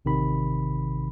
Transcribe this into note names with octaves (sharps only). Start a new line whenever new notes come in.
A1 C3 D#3 B5